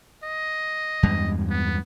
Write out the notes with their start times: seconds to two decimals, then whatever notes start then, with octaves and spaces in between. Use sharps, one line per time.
0.24 D#5
1.03 E2 G2 G#3
1.50 B3